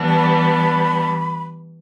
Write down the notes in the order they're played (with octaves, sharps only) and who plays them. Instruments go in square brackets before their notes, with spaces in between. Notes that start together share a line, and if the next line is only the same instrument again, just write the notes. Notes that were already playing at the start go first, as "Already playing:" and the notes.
Already playing: [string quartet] E3 G3 B3 D4
[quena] A5
B5